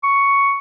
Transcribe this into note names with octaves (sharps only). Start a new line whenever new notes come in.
C#6